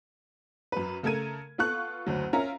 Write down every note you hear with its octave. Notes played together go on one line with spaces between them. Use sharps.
F#2 B4
C#3 A3 A4 A#4 G#6 D#7
B3 F4 A4 C#6 F#6
F#1 D2 F#3
C#4 F4 A#4 E5 A#5